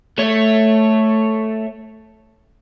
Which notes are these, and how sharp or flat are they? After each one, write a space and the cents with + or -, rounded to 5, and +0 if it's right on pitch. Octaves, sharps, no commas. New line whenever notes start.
A3 +0 C#5 +0